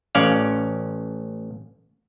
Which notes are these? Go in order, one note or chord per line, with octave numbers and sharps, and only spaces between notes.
A1 C#4 D5 F5